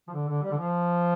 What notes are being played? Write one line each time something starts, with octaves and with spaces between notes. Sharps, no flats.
F3
D3
D3
G3
D3
F3